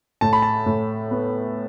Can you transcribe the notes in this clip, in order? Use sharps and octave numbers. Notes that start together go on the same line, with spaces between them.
A2 A5
B5
A5
A2
B3